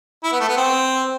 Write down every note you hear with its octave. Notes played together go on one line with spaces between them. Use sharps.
E4
B3
A3
B3
C4